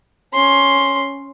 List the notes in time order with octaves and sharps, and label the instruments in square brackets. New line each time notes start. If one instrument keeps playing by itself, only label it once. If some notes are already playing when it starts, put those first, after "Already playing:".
[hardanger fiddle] C#4 C6